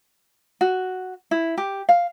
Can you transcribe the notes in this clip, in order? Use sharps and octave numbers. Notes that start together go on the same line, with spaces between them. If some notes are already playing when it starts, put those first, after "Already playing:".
F#4
E4
G4
F5